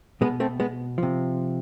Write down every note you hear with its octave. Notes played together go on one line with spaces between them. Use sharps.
B2 G#3 B3
A3 C4
G#3 B3
C3 F3